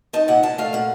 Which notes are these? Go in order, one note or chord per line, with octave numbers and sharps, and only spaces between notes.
D#4 A5
A#2 F#5
A#2 A5
A3 F5
A#2 F#5